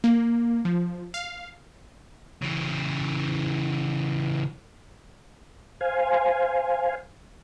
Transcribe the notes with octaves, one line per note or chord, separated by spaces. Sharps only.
A#3
F3
F5
C#3 E3
C5 F5 G#5